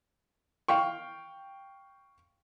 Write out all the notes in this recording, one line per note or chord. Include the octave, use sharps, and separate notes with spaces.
F5 G5 C#6